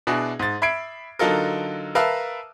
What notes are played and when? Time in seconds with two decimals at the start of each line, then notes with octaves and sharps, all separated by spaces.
0.07 B2 D4 E4 F#4 G#4
0.39 G#2 A6
0.62 E5 B5 G#6 C7 D7
1.19 D3 F#3 D#4 F4 A4 A#4
1.95 A#4 B4 E5 F5 A5 E6